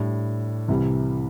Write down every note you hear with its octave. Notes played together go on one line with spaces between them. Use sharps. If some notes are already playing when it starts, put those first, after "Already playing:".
Already playing: A2 G3 D4
C2 C3 E3 G3